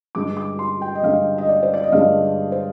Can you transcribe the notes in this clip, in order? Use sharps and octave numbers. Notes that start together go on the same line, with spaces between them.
G2 D3 G#3 D6
D6
C6
G5
D#5
G2 D3 G#3 F5
D#5
D5
C5
D5
D#5
G2 D3 G#3 F5
C5